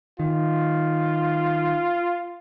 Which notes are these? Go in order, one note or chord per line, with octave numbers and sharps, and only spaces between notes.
D#3 F4